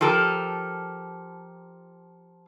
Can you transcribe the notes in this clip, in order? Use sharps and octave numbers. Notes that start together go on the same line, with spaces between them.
F3 G4 A4 A#4